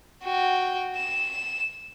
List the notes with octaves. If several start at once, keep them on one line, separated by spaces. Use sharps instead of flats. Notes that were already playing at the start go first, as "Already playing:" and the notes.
F#4 G5
E7